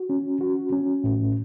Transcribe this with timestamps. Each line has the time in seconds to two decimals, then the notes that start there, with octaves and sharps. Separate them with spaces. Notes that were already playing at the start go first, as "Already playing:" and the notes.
Already playing: F#4
0.10 C#4
0.41 F#4
0.72 C#4
1.04 A2